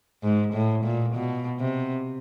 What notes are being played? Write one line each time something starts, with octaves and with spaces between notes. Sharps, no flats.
G#2
A2
A#2
B2
C3